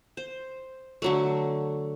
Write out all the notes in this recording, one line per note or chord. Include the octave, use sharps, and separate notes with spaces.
C5
D3 F#3 A3